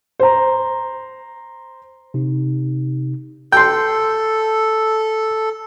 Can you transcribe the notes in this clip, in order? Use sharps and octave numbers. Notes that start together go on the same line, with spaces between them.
C5 A#5
C3 D#4
A4 G5 C6